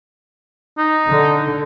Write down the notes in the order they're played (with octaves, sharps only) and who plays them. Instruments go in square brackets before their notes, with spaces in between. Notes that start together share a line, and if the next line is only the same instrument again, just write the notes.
[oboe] D#4
[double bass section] D3